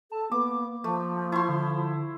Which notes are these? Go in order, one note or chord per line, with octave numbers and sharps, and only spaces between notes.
A4 A5
A#3 B3 D6
F3 A3
E4 C6 C#6
D3